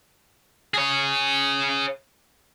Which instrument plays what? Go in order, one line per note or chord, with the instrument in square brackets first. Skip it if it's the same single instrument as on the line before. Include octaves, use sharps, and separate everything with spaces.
[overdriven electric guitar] G#4 C#5